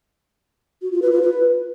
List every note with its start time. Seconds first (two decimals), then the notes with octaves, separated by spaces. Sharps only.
0.82 F#4
0.92 F4
1.02 B4
1.12 F4
1.22 B4